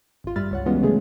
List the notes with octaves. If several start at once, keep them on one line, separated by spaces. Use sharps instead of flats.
G#1 F4
G2 G3 E5 B5 F6 A6
C#2 C#5 F#5
E3 G3 G#3 B3 C#4 F4
C#3 E3 F#3 G#3 A3 G#4